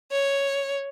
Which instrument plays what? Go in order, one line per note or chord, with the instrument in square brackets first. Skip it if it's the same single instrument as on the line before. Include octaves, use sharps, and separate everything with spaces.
[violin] C#5